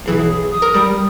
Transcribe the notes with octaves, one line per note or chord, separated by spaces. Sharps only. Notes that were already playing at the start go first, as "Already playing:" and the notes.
B1 E3 G#4
G#4
D#6
A#4
G3